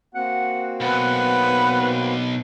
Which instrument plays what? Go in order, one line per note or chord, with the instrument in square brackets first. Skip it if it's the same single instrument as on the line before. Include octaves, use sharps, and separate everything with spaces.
[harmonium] A#3 C4 F#4 [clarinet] F#5
[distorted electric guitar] B1 [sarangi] B4 [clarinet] F#5